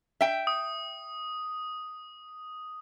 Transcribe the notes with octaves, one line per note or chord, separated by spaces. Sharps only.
E5 G5
D#6